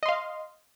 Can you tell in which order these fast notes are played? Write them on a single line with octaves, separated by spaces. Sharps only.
D#5 C6 F5